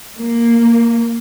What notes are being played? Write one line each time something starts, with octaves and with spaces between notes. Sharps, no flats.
A#3